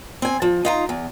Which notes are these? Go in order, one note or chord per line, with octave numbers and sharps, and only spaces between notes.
C4 G#5
F3
D#4 F4 A#5
E2